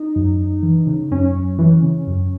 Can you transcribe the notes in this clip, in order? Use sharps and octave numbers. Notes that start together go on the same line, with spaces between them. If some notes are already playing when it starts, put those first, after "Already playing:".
Already playing: D#4
F#2
F#2
E3
C#3
F#2 C#4
F#2
E3
C#3
F#2